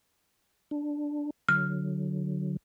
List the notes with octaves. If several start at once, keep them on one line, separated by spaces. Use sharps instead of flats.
D4
D3 F#3 F6